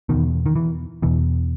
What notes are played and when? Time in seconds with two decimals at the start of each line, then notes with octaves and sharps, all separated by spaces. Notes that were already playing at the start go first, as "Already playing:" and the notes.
0.09 E2 B2 D#3
0.46 D#3
0.55 E3
1.02 E2 B2 E3